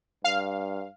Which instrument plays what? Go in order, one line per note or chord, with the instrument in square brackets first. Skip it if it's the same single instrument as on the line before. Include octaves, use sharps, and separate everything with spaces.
[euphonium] G2 [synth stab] F5